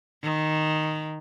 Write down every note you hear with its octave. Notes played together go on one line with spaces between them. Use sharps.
D#3